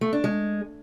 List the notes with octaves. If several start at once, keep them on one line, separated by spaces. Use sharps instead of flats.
A3
D4
G#3